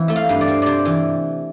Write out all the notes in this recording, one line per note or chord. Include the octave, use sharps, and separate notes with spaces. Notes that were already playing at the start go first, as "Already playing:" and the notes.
Already playing: E3 C4
A3 E5
F5
G2
D5
C4
C3 C5 D5
E3